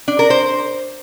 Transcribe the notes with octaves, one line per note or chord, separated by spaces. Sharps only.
D4
A#4
C5